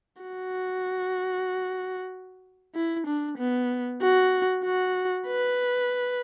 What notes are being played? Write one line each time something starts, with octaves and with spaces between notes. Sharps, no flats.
F#4
E4
D4
B3
F#4
F#4
B4